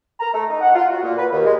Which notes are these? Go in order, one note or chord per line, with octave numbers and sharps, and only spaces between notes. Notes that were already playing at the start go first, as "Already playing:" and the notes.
A#5
A3
D#4
F#5
F4
F#4
A#2
B4
D#2
G#3